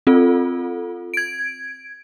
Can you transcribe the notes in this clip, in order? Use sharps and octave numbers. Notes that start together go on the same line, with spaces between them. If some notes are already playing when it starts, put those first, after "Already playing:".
C4 F4 A4
G#6 D7